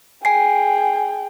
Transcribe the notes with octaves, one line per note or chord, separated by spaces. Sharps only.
G#4 G5 G#5 C7